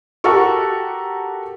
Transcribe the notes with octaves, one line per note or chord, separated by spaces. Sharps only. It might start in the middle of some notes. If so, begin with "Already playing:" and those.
F#4 G4 A4 A#4 C#6